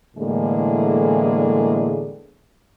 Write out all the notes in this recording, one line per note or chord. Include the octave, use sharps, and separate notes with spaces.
E2 A2 D3 G#3 A#3 G#4